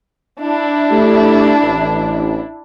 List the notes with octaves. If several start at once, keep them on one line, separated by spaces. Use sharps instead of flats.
D4 E4
A3 G4
A1